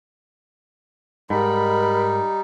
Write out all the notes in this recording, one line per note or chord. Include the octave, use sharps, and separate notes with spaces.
G#2 G3 D#4 A#4 B5